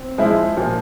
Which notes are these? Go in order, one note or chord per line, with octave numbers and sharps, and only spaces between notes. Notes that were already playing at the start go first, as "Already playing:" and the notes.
Already playing: C4
F3 G#3 E4
A#2 F3